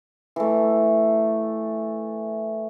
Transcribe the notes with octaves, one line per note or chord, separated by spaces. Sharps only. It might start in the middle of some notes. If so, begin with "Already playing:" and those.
E3 A3